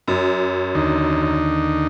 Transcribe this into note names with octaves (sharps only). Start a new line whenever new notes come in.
F#2
D#2 D3 D#4